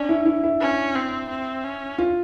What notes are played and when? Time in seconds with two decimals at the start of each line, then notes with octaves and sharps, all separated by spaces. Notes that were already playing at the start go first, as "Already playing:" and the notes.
Already playing: C#4 D4
0.09 E4
0.25 E4
0.44 E4
0.61 C#4
0.95 C4
1.30 C4
1.64 C#4
1.98 F4